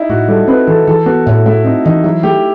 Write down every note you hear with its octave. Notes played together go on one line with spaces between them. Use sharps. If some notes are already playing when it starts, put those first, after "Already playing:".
Already playing: D#4 E4
A2 F#4
G3 A4
C4 B4
E3 A4
E3 A4
B3 F#4
A2 E4
A3 E4
C4 D#4
E3 D#4
F#3 E4
A3 G4